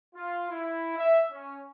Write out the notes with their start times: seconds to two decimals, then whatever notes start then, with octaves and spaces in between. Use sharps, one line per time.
0.15 F4
0.51 E4
0.97 E5
1.31 C#4